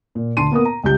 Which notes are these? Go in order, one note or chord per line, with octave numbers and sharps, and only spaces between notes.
A#2
D2 D3 A5 C6 D#7
A#3 B3 A#4 D#6
A#5
C#2 G3 G4 G6